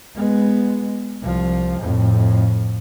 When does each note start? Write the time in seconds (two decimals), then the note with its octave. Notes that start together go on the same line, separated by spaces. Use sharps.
0.16 G#3 B3
1.23 C2 F3
1.81 F2 A2